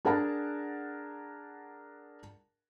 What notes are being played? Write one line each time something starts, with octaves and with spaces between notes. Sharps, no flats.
D4 G#4 A#4 F#5 A5